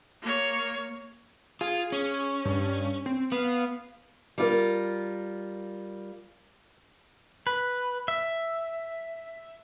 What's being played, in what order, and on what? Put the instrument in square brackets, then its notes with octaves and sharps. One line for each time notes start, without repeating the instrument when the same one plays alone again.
[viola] A#3 C#5
[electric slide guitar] F4 [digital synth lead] G#4
[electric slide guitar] C#4
[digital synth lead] G2
C4
[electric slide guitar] B3 [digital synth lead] F5
[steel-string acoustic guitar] G3 F4 A#4
[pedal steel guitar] B4
E5